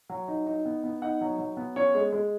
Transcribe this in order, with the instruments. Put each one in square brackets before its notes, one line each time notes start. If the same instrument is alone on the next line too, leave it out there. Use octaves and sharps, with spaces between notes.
[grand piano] F#3
D#4
D#4
B3
B3
D#4 F#5
F#3
F#3
B3
C#4 C#5
G#3
G#3